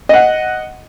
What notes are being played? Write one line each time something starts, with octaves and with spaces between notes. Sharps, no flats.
D#5 F#5